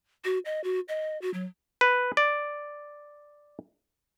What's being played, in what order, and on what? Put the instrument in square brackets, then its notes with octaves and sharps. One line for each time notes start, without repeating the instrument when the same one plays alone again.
[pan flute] F#4
D#5
F#4
D#5
F#4
F#3
[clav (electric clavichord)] B4
D5